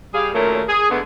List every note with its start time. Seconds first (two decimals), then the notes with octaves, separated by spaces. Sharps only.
0.13 G3 G#4 F5
0.33 D#2 A#2 F#3 A3 C#4 A#4
0.68 G#4
0.90 D3 G#3 A3 B3